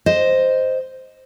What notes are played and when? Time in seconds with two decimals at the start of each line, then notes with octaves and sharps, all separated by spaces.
0.06 C5 D#5